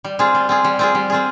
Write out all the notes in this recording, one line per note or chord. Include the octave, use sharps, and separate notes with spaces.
G3
C4 F4 G#4
G3
C4 F4 G#4
G3
C4 F4 G#4
G3
C4 F4 G#4